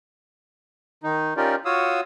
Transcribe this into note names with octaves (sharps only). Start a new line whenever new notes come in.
D#3 D#4
C#4 D#4 F4 G4 A#4 D5
F4 F#4 C#5 F5 D#6 E6